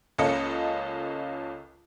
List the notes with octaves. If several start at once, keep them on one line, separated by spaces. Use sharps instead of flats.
C#2 A#3 C#4 A4 D#5 C#7